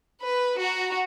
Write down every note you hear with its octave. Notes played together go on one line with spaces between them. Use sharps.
B4
F#4 A#5